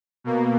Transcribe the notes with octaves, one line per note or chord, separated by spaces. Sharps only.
B2 A#3